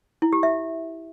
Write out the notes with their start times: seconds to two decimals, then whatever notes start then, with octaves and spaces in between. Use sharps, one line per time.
0.22 E4
0.33 G4
0.43 E5